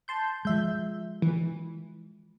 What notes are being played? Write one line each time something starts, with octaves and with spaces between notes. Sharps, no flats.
A5 C6 G6
F3 G#3 E5 G6
E3